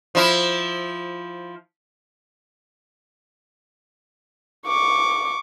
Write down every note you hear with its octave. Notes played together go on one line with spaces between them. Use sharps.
F3 E4
C#6 D6